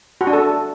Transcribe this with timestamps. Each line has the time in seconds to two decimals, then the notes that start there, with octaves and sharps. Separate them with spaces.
0.21 F#4
0.27 D4
0.33 A4